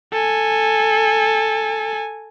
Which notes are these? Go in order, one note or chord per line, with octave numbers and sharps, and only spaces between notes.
A4 G#5